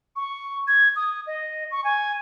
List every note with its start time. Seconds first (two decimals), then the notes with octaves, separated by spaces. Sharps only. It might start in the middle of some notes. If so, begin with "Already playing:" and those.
0.16 C#6
0.68 G#6
0.96 D#6
1.27 D#5
1.71 C#6
1.84 G#5